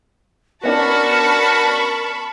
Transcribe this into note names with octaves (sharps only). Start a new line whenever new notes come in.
B3 C#4 D4 F#4 A#4 A5 B5 C#6